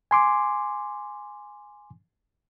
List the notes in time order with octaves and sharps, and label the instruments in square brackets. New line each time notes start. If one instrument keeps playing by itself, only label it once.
[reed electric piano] G#5 C6 D6